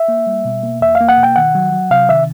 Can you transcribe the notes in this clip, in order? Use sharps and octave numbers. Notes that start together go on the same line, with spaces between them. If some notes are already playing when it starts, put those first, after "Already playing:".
Already playing: E5
A#3
G3
B2
A#3
E2 E5
F5
A#3
F#5
B2
G5
D#3 F#5
F#3
F#3
C3 F5
D#3 E5